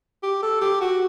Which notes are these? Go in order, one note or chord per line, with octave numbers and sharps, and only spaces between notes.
G4
A4
G4
F#4